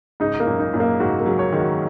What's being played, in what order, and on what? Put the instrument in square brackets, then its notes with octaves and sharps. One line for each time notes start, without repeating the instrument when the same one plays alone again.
[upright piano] G#2 C#3 [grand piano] D#4
[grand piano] A#3
[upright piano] F#2 A#2
[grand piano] D#4
[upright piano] F#2 A#2
[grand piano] A#3
[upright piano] G#2 C#3 [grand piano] F#4
[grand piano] A#3
[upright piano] C#3 F#3
[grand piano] C#5
[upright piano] D#3 G#3
[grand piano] F#4